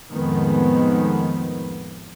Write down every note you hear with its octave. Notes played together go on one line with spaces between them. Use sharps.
F2 A2 D#3 G#3 B3